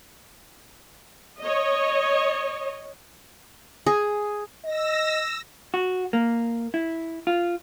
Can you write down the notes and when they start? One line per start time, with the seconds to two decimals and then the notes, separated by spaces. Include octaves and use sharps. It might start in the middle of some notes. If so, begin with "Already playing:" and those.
1.40 C#5 D#5
3.86 G#4
4.64 D#5 E6 A#6
5.74 F#4
6.13 A#3
6.74 E4
7.27 F4